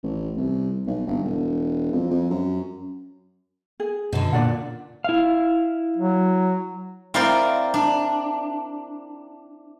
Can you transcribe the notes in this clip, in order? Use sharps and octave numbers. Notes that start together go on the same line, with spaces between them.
A1
C2
B1
G1
E1
F2
F2
F#2
G#4
F#2 B2 D3
A#2 D4 D5 F#5
E4 F5
F#3
C4 E4 A#4 C5 D5 F5
D4